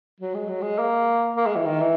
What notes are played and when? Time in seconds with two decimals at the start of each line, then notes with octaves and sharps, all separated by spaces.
0.20 F#3
0.35 G#3
0.49 F#3
0.62 G#3
0.79 A#3
1.36 A#3
1.46 G#3
1.56 E3
1.66 D#3
1.81 E3